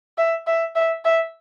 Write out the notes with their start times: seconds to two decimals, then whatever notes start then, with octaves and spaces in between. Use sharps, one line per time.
0.18 E5
0.47 E5
0.75 E5
1.05 E5